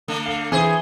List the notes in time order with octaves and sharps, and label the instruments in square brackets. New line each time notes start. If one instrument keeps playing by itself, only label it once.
[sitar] D3 A3
[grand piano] F5
[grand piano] E3 [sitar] G#4 C5